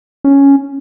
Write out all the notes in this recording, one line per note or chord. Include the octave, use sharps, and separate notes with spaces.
C#4